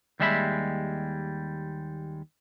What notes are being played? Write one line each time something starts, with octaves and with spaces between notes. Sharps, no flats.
D#2 G3 G#3 E5 A#5 B5